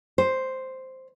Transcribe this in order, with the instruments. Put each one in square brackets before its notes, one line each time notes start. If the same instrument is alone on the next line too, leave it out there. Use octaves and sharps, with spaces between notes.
[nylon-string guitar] C5